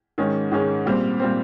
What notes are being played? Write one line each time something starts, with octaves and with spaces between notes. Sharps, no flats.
G#2 D#3 G#3 C#4
G#2 D#3 G#3 C#4
A#2 G3 C4
A#2 G3 C4